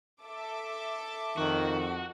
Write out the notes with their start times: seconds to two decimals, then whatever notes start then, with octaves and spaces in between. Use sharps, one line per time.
0.22 A4 E5 D6
1.37 F2 D#3 F#4